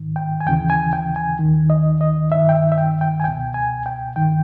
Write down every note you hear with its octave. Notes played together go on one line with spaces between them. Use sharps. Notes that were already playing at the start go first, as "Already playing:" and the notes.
Already playing: G#2 D#3
G5
G#5
D#2 C#3 E3 G5
G#5
G5
G#5
D#2 D#3
D#5
D#5
G2 D#3 E5
G5
E5
E5
G5
G5
G#5
C#2 B2 G5
G#5
G5
G2 D#3 G5